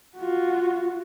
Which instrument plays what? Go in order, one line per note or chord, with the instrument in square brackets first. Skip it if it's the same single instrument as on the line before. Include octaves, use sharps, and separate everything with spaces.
[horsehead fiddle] F4 F#4